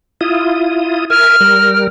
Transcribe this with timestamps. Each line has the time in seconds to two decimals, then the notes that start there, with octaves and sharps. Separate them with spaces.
0.21 E4 F4 D#6
1.10 A#4 E5 G#5 F6
1.41 G3 A#4